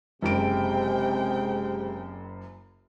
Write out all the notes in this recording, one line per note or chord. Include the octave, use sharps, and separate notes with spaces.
F#1 F#2 C3 G#3 G5 D7